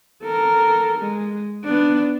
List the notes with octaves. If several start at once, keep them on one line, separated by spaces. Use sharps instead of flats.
A4 A#4
G#3
B3 D4